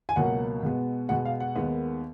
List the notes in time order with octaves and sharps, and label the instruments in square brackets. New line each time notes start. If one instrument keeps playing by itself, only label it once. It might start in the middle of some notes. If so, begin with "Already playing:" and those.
[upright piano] G#5
C#2 B2 F#3 A#3 F#5
B2 G#3 B3
B2 G#3 B3 F#5
F5
F#5
D#2 D#3 G#3 B3